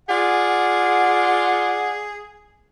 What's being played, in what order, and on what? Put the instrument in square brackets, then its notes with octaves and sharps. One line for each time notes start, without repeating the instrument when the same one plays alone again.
[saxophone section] F4 D5 F#5 [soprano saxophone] G#4